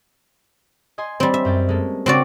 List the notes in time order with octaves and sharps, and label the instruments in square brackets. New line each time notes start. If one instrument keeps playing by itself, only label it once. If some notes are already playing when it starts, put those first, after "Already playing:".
[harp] D#5 G#5 C6
[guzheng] G3 C4
E5
[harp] F#2 G5 A6
G#3 A#3 A4
[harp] C#3 D6 [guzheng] C4 F#4 D5